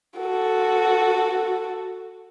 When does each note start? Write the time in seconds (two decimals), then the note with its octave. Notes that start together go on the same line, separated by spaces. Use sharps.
0.18 F#4 A4